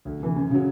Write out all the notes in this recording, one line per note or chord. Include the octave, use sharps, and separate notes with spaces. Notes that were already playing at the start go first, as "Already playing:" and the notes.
D2
C3 E3
F#2
C#3 F#3